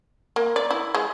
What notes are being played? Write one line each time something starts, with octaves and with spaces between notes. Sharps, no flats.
A#3
D5
E4
G#3